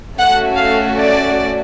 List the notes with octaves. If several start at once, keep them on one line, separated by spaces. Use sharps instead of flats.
A3 C#4 F#4 A4 F#5
F5
D5